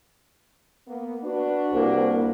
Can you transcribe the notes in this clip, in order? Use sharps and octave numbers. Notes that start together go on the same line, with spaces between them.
A#3 B3
D4 F#4 B4
C2 A#3